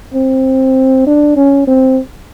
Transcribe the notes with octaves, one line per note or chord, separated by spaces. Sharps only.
C4
D4
C#4
C4